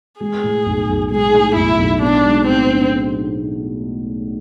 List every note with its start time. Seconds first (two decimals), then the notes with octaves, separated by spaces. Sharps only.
0.21 G#3 G#4
0.43 A2
0.66 B1
0.89 B1
1.11 G#3 G#4
1.34 A2
1.56 B1 E4
1.78 B1
2.01 B3 D4
2.24 G#3
2.47 A2 C4
2.70 D4